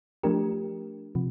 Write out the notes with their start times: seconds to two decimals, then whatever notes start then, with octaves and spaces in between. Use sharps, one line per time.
0.23 F3 A3 D4 G4 A#4
1.15 C3 F3